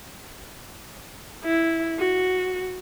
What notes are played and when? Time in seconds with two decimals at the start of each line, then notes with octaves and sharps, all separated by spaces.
1.45 E4
1.99 F#4